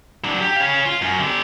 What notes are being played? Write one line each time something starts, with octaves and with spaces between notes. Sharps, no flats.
F#3 D4
G4
C#4 F5
F4
F#2
D3 G4